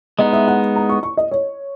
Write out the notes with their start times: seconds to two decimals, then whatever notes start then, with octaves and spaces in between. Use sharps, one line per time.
0.19 G#3 B3 D#4 D#5
0.33 E5
0.48 F#5
0.76 A#5
0.89 C#6
1.03 C#6
1.17 D#5
1.31 C#5